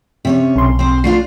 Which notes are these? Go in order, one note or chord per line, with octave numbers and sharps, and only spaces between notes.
C3 C#4 C#5
B1 C6
C4 C5
A3 D4 F4 C7